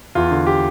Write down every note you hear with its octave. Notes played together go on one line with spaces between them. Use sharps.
E2 F4
D3
G4